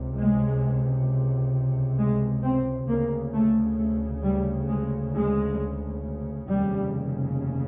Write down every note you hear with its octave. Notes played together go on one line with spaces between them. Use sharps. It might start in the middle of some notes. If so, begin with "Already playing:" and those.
Already playing: C#2 C3
G#3
G#3
C4
D2 C#3 A#3
A3
A3
G3
G#3
G#3
F1 D#2 C#3 G3